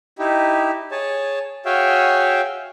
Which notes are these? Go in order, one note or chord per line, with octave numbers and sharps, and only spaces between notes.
D#4 E4 G4
G#4 C#5 A5
F#4 G#4 C#5 E5 F5 G5